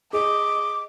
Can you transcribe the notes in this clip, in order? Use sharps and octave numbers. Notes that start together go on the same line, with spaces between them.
G#4 D#5 D6